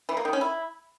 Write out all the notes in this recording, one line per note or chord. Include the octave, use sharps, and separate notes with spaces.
E3
A#3
D#3
C#4
E4